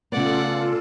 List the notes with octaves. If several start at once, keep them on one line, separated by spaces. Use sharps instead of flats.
C#3 A3 B3 F4 A4 D5 F#5